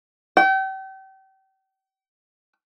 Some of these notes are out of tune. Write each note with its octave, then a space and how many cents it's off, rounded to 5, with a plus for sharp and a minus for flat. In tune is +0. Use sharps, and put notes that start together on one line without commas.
G5 -35